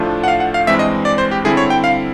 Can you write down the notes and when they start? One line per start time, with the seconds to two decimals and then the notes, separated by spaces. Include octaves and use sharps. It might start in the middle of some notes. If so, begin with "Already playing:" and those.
Already playing: A2 F3 A3 D4 F4
0.24 F#5
0.28 F5
0.40 F#5
0.54 F5
0.67 G2 E3 G#3 C4 E5
0.79 D#5
1.05 D5
1.18 C5
1.31 G4
1.45 D3 G3 C4 E4 G#4
1.57 C#5
1.70 G5
1.84 F5